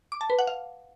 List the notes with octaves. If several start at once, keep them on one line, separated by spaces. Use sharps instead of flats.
D6
A5
B4
F#5
F5